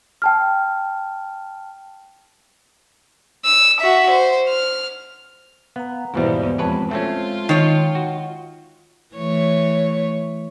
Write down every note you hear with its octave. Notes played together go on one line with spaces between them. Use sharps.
G5 A5 F6
E6
F#4 E5
C5
F6
B3 F5 A#5
E2 G#2 B2 G3 B3 E4 C5
F2 G#3 G4 B4 C#5 A5
A3 C4 C#4 F4
D#3 C#5
F#4
E3 A3 C#5